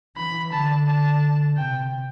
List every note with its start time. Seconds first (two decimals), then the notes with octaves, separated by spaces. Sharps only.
0.17 E3 B5
0.52 D3 A5
0.86 A5
1.56 C3 G5